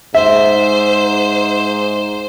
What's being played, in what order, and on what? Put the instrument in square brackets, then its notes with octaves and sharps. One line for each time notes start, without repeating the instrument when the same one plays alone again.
[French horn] G#2 [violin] C5 [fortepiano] E5